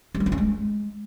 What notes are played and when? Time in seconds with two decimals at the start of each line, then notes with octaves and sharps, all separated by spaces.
0.14 G3
0.20 D4
0.26 D#4
0.32 C#4
0.38 G#3